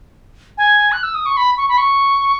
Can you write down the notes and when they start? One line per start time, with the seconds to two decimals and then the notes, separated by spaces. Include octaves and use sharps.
0.58 G#5
0.92 F#6
1.03 E6
1.15 D#6
1.26 C#6
1.37 B5
1.57 C#6
1.69 B5
1.78 C#6